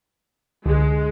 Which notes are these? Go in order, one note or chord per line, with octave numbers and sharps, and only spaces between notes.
C#2 D3 G#3